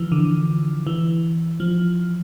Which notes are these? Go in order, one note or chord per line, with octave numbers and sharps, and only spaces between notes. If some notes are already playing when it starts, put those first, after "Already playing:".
Already playing: E3 F3
D3
E3
F3